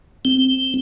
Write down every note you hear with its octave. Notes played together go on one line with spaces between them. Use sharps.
C4